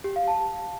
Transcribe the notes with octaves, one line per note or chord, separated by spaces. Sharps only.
G4
F5
A5